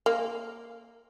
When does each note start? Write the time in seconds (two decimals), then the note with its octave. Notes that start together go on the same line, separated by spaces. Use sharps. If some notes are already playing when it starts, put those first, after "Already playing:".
0.06 A#3